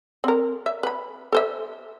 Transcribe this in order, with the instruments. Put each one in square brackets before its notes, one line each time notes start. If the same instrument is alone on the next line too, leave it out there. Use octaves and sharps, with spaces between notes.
[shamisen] C4 A#4
E5
B4 B5
A4 C5 E5